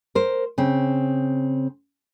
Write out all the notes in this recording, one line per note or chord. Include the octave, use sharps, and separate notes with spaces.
A#4 C5
C#3 C4